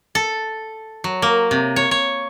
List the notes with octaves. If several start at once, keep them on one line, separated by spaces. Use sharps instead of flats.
A4
F#3
A#3
C3
C#5
C#5